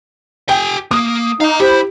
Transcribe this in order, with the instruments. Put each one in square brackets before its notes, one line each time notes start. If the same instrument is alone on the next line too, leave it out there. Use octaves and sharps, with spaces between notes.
[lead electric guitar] G4 G#5 [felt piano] G5
[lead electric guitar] A#3 [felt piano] D#6
[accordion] D#4 [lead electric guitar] F5 A#5
[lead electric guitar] E4 [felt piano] G4 [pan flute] C5 [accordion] B5